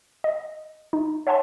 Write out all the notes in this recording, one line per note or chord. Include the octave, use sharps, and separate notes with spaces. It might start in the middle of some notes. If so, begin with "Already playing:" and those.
D#5
D#4
C#5 E5 F#5 G#5 A5 C6